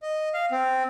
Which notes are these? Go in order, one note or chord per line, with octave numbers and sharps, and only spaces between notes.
D#5
F5
C4